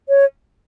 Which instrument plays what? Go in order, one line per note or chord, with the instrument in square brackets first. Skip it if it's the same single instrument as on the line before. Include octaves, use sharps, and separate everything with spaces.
[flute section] C#5